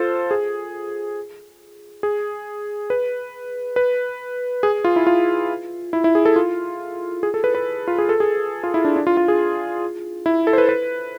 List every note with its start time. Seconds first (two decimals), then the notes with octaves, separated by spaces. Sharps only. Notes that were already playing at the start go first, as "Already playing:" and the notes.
Already playing: F4 A4 C5
0.31 G#4
2.03 G#4
2.90 B4
3.76 B4
4.63 G#4
4.84 F4
4.96 E4
5.07 F4
5.93 E4
6.04 E4
6.15 G#4
6.25 A4
6.36 F4
7.23 G#4
7.34 A4
7.44 B4
7.55 B4
7.88 F4
7.98 G#4
8.09 A4
8.20 G#4
8.63 F4
8.74 E4
8.85 D4
8.96 D4
9.07 F4
9.17 F4
9.28 G#4
10.26 E4
10.47 A4
10.53 C5
10.58 B4
10.69 B4